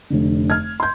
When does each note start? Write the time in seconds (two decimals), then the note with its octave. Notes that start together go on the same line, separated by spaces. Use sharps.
0.10 F1 D3
0.50 F6 G#6
0.80 C6 G6